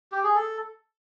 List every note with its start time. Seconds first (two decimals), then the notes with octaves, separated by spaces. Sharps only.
0.12 G4
0.24 G#4
0.35 A4